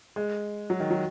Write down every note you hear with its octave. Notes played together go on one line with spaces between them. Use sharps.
G#3
F#3
D#3
F#3